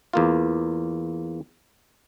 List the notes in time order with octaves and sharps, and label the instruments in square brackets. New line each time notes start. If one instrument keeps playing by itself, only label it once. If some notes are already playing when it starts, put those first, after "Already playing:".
[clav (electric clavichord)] E2 A#3 F4